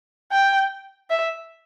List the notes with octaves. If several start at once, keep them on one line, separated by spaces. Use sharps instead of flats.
G5
E5